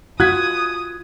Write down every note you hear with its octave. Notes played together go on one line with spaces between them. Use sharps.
F4 F#4 D#6 F#6 G#6 B6